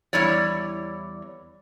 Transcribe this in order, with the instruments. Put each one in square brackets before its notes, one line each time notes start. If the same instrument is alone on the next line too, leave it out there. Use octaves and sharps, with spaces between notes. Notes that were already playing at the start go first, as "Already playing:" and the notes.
[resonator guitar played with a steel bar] E2 G3 E4 C#5 D5